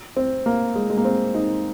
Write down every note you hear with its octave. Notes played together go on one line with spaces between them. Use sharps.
C4
A#3
G#3
G#3
A#3
C4
D#4